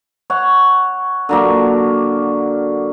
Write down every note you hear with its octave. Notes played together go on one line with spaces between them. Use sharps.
C#5 F#5
D3 F#3 A#3